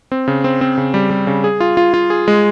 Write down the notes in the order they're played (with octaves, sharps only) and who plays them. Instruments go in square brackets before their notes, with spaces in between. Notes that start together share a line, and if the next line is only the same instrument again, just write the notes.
[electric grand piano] C4
C#3
C4
C4
C#3
G3
G3
C#3
G#4
F4
F4
F4
G#4
G#3